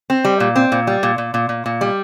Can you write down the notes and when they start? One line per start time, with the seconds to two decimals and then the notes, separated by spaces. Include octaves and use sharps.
0.10 C4
0.25 G3
0.40 A#2
0.56 C4
0.72 A#2
0.87 G3
1.03 A#2
1.18 A#2
1.34 A#2
1.49 A#2
1.66 A#2
1.81 G3